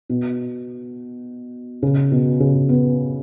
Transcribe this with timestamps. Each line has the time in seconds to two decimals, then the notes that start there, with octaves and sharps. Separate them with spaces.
0.09 B2
1.82 C#3
2.11 B2
2.40 C#3
2.69 B3